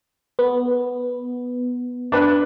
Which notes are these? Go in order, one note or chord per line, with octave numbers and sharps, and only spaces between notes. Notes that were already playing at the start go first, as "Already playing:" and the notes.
B3
D4 B4